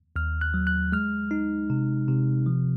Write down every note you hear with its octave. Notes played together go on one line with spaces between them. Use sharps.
D#2 F6
F#6
F#3
F#6
G#3 F6
D#4
C3
C3
F3